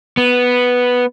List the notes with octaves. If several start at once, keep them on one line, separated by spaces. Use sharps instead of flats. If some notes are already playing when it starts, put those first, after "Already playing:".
B3